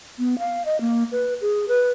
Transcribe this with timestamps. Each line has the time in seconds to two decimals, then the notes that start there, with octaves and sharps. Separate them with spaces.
0.19 B3
0.39 F5
0.65 D#5
0.81 A#3
1.12 B4
1.41 G#4
1.68 B4